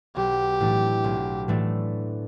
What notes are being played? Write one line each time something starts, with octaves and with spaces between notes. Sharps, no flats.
B1 G4
A2 E3 A3 D4
B1
A2 E3 A3 D4